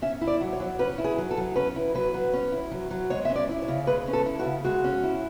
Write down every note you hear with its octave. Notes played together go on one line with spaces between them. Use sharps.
C#4 E5
E4
D5
F#3
C#5
F#3
C#4 B4
E4
G#4
F#3
A4
F#3
C#4 B4
E4
F#3 B4
F#3
C#4
E4
F#3
F#3
G#3 C#5
C#4 E5
D5
E4
C#5
C#3
G#3 B4
C#4
A4
E4
F#4
C#3
G#3 F#4
C#4
E4